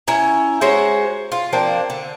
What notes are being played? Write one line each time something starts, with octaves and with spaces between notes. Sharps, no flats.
C#4 E4 A#5
G#3 F#4 C5 C#5
F4
F3 A#3 C4 D4
D3